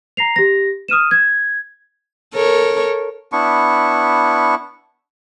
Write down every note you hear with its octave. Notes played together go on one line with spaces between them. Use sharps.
A#5 A#6 C7 F7
G4 A#6
D#6 F6 D#7 E7
G#6
A4 A#4 C#5
B3 D4 E4 C#6